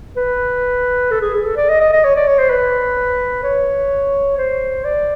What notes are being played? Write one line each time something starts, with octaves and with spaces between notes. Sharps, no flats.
B4
A4
G#4
G#4
A4
D5
D#5
D#5
D#5
C#5
D5
C#5
C5
B4
C#5
C5
D5